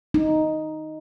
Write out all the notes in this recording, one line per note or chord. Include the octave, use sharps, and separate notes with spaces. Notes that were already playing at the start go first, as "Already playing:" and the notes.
D#4